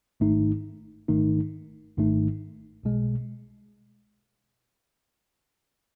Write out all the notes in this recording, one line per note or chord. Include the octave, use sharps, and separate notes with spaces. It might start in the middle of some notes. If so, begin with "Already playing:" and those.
G#1 G#2 D#3 A3 D#4
G#1 G#2 D#3 A3 D#4
G#1 G#2 D#3 A3 D#4
B1 B2 G#3